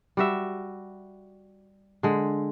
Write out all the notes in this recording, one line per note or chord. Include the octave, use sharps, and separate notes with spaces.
G3 F#4 E5
D3 G#3